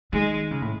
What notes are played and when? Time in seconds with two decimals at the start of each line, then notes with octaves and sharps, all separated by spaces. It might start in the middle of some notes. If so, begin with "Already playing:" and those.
0.12 D#3 G#3
0.51 C#3
0.62 A2